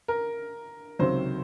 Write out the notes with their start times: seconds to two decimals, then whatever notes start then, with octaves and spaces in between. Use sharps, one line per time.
0.08 A#4
0.99 C#2 C3 D#3 F#3 C5